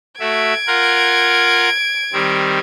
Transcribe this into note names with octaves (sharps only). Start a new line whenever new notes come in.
A3 F#4 E5 G#6 D7
F4 A#4 F#5
D#3 G3 C4